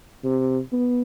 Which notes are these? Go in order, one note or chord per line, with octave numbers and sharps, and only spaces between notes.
C3
B3